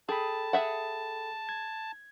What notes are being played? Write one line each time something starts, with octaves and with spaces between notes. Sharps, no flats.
G#4 A4 G5 A5 B5
G#4 E5 F#5
G#6